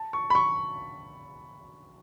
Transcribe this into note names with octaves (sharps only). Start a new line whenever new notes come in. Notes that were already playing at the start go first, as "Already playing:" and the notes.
Already playing: A5
C#6
B5
C#6